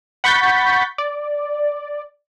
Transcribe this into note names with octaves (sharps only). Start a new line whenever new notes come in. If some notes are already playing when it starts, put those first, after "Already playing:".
F#5 B5 C#6 G6 A6 B6
D5